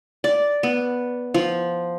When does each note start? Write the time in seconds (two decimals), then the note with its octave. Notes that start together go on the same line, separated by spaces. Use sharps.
0.24 D5
0.63 B3
1.34 F3